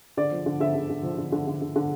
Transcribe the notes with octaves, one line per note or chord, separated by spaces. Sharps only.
D3 D5
F3
D3
D3 E5
D3
D3
F3
D3
D3
D3
D3
D3